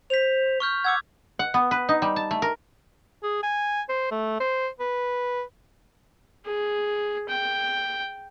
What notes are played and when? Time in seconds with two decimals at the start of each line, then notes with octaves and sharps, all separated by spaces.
0.10 C5 B6 F7
0.60 C#6 F6 G6
0.84 F#5 D6 E6 G#6
1.39 F#5
1.54 B3
1.71 B4
1.89 D#4
2.02 G3
2.16 A5
2.31 A3
2.42 A#4
3.23 G#4
3.43 G#5
3.89 C5
4.11 A3
4.40 C5
4.80 B4
6.46 G#4
7.29 G5